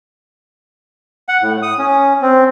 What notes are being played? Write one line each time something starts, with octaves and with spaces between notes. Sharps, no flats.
F#5
A2
D#6
C#4
C4